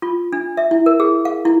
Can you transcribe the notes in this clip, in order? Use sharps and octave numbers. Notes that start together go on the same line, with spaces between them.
F4
D4
E5
E4
A#4
G#4
F5
E4